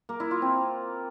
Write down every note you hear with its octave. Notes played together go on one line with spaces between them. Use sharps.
A#3
E4
F4
C4